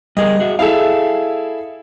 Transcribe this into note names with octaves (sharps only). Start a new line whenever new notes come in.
G3 G#4 A#4 D#5
F#4 G#4 E5
E4 G#4 A4 E5 F5